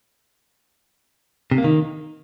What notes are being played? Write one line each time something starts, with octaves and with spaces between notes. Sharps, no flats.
C3
A#3
D#3